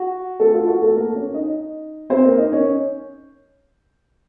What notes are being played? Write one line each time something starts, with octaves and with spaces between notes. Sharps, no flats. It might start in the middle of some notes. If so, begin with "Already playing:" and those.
Already playing: F#4
A3 A4
F4
F#4
A3 A4
A#3 A#4
C#4 C#5
D#4 D#5
C4 C5
A#3 A#4
D#4 D#5
C#4 C#5